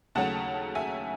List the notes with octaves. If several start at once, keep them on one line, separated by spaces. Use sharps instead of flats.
D#2 C#3 F#3 A3 F#5 A5
E5 G#5